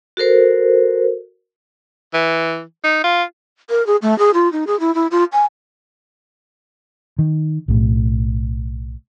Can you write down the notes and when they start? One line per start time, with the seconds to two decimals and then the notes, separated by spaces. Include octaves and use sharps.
0.17 F#4 A4 A#4 C5
2.14 E3
2.84 D#4
3.04 F4
3.70 A#4
3.87 G#4
4.02 A3
4.19 G#4
4.34 F4
4.52 D#4
4.67 G#4
4.80 E4
4.95 E4
5.11 F4
5.33 G#5
7.19 D#3
7.68 B1 A2